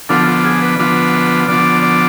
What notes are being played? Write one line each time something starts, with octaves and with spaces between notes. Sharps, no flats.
D3 F3 B3 D4 F4 A4
F4
G#4
B4
D3 F3 B3 D4 F4
D3 F3 B3 D4 F4 D5
D5